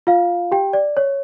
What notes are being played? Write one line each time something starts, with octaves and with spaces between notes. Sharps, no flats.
F4 F5
G4 G5
D5
C#5